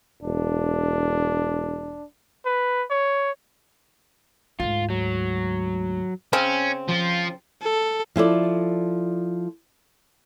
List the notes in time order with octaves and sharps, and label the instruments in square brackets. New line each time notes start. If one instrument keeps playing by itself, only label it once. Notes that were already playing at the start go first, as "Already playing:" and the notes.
[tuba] E1 [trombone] D4
[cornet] B4
C#5
[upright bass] D2 G#2 [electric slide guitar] F4
[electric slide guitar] F#3
[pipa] C#3 C4 [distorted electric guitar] C#4
[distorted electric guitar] F3 F4
[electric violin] A4
[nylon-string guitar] F3 E4 A4 D5